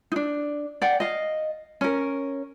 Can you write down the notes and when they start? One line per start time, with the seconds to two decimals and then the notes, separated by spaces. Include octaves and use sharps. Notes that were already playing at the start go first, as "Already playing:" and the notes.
0.12 D4 D#4
0.82 D5 F#5 G5
1.00 D#5 F5
1.81 C#4 A#4